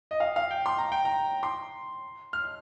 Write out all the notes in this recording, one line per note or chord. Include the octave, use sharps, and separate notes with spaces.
D#5
F5
F5
G5
C6
A#5
G5
A#5
C6
F6